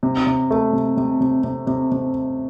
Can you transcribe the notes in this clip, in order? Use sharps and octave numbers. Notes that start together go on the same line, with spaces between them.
C3
C3
A3
C3
C3
C3
C3
C3
C3